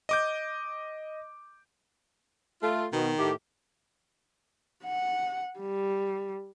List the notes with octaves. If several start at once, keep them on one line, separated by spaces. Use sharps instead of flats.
D#5 D6 G6
A3 F4
B2 D#3
A2 A3 G4
F#5
G3